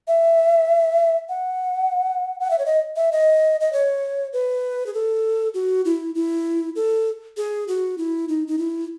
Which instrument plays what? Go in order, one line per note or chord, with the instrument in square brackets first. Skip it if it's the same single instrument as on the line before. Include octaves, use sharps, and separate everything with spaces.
[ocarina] E5
F#5
F#5
E5
C#5
D#5
E5
D#5
D#5
C#5
B4
G#4
A4
F#4
E4
E4
A4
G#4
F#4
E4
D#4
D#4
E4